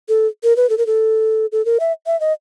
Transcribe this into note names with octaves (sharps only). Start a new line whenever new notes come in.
A4
A#4
B4
A4
A#4
A4
A4
A#4
E5
E5
D#5